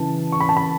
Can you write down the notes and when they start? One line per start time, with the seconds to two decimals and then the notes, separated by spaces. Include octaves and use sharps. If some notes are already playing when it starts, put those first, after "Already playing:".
Already playing: C#3 E3 A5
0.32 C#6
0.40 B5
0.49 A5
0.57 B5